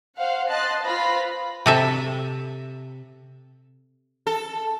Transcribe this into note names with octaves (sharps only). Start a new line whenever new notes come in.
C5 F5 F#5
D#5 A5 C6 F#6 A6
F4 B4 C5 F5 B5 A#6
C3 A4 E5
A4